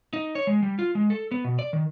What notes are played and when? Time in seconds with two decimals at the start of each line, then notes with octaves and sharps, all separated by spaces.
0.13 D#4
0.35 C#5
0.47 G#3
0.63 G3
0.79 F4
0.95 G#3
1.10 A4
1.31 B3
1.44 B2
1.59 D5
1.73 D#3